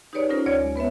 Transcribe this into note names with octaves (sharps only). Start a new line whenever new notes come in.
D#4 G4 G#4 B4 C#5 D5
C#4 D#4 F4 A#4 C5
D2 F#3 C#5 D5 G#6 A#6
G#3
B3 B4 C#5 E5